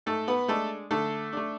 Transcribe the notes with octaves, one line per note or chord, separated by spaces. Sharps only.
G#2 A3 A4
B3 B4
G#3 A3 D4 A4
D3 A3 A4
A3 D4